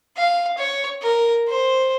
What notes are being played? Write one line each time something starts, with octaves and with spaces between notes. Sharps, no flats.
F5
C#5
A#4
C5